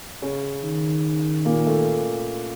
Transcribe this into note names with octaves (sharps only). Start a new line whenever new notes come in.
C#3 C#4
D#3
A#2 A#3
A3